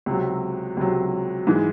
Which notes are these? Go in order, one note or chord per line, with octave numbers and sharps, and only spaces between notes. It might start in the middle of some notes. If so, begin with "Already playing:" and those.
C#2 C3 F#3
C#2 C3 F#3
G#2 E3 G#3